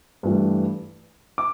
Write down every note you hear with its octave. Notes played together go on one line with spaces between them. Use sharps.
G2 E3 A3
D6